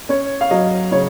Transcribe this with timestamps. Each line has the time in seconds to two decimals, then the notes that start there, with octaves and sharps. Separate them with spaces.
0.09 C#4 C#5
0.41 F5
0.51 F#3 D#5
0.92 C#3 C#5